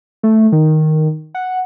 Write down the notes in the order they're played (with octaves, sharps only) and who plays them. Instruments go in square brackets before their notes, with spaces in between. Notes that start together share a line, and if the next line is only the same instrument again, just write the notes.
[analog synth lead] A3
D#3
F#5